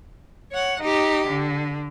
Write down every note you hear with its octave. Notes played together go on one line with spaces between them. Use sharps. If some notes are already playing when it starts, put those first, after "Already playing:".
C#5 F#5
D#4 G4
D3